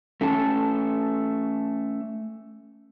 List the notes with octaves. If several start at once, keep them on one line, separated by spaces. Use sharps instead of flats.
A3 C#4 A4 G#5 A5